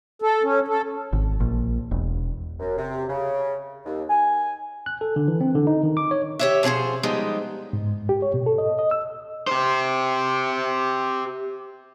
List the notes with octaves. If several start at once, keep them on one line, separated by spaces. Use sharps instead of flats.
A4
C#4
A4
G#1
A#1
E1
F#2
C3
C#3
D#2
G#5
F#6
A4
D3
E3
C4
D3
D#4
D#3
D6
C#5
G4 C#5 E5
B2 F3 C#4 G#4 C5
F3 G3 G#3 B3 D#4
G#2
G4
C#5
B2
A4
D#5
D#5
E6
G4 C5